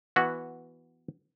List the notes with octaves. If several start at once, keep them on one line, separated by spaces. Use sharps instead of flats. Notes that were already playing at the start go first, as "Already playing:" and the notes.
E3 B3 F#4